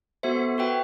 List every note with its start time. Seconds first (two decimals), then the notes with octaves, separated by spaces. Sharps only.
0.23 B3 F#4 A4 C5 E5
0.58 F#4 B4 E5 G5